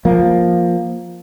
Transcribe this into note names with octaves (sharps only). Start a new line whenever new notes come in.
F3 A#3